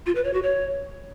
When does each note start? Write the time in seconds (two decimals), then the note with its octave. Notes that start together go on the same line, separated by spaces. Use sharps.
0.06 F4
0.15 B4
0.24 C#5
0.33 F#4
0.43 C#5